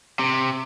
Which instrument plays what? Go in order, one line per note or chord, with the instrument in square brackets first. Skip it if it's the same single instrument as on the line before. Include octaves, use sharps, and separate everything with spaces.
[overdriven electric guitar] C3